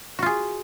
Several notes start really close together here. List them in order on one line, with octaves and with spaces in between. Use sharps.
F#4 F4 G#4